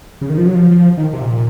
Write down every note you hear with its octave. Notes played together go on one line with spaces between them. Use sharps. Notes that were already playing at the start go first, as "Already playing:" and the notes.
C#3
D#3
F3
F#3
F3
F3
D#3
C3
A#2